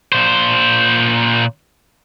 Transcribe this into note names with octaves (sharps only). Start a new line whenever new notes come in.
A#2 C5